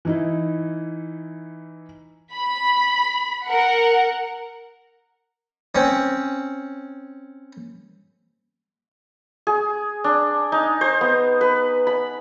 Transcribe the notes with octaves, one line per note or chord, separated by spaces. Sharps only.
E3 D#4 E4
B5
A#4 F#5
C4 C#4
G#4
D4
D#4
C5
B3
B4
B5